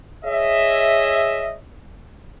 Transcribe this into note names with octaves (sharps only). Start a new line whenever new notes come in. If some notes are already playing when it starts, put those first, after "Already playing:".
G#4 C#5 D#5 E5